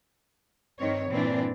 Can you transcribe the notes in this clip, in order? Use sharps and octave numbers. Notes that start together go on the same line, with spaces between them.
G2 D#3 C4 C#5
G2 A#2 E3 C4 D4